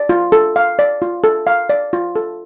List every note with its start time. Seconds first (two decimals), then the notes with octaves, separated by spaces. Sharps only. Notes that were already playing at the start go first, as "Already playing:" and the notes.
Already playing: D5
0.09 F4
0.32 A4
0.56 F5
0.79 D5
1.02 F4
1.24 A4
1.47 F5
1.69 D5
1.93 F4
2.16 A4